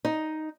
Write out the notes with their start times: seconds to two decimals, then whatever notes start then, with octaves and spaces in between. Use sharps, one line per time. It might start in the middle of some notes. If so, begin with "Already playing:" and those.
0.05 D#4